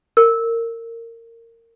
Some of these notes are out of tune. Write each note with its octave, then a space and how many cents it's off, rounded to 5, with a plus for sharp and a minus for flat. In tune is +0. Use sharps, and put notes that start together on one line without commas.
A#4 -25